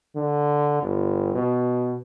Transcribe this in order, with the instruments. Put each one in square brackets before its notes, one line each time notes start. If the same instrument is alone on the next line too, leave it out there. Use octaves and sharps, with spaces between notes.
[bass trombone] D3
G1
B2